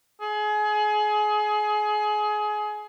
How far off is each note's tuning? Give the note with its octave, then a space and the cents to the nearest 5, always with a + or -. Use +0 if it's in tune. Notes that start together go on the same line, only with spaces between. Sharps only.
G#4 +25